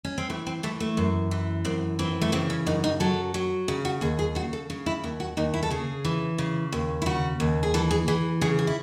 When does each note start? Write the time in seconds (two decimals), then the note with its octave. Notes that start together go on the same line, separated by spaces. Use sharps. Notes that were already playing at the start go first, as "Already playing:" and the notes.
0.04 C#4
0.18 C4
0.30 E3 A3
0.47 C4
0.63 E3 A3
0.80 A3
0.97 F#2
1.31 E3
1.65 F#2 C4
1.99 E3 C4
2.21 A3
2.32 C#3 C4
2.50 C#4
2.66 F#2 D#4
2.84 D#4
3.00 F#3 A4
3.34 F#3
3.68 C#3
3.85 F#4
4.01 D#2 G#4
4.19 G#4
4.35 C#3 F#4
4.53 A4
4.70 C#3
4.86 E4
5.03 D#2 E4
5.20 F#4
5.37 D#2 D#4
5.54 E4
5.63 A4
5.70 C#3 G#4
6.05 E3
6.38 C#3
6.72 D#2
7.02 E4
7.06 C#3 F#4
7.40 D#2
7.63 G#4
7.74 E3 A4
7.91 G#4
8.08 E3 G#4
8.41 C#3 G#4
8.59 G#4
8.67 E4